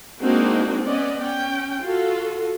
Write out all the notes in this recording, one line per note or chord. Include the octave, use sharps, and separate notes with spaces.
G#3 A#3 C4 D4 D#4 F#4
B3 C#4 D5 D#5
C#4 G5
F4 F#4 A4